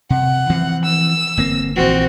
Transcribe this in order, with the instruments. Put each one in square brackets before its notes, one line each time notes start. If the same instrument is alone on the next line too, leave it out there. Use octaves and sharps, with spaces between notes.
[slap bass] C3 [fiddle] F#5
[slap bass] E3 F3 C4
[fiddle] E6
[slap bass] G1 A#3 C4
[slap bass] A#1 E3 F3 [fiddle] C4 F#4